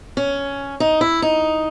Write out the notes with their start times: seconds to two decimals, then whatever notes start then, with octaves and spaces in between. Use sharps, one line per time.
0.17 C#4
0.80 D#4
1.01 E4
1.22 D#4